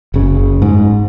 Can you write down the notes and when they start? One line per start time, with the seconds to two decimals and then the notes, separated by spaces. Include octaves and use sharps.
0.14 F#1 C#3
0.62 G#2